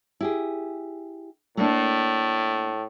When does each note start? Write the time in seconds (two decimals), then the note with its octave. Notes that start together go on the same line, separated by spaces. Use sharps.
0.21 E4 G4 G#4
1.57 A2 A3 A#3 D4